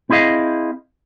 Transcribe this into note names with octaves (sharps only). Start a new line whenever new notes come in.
C4 E4 G#4 D#5 F5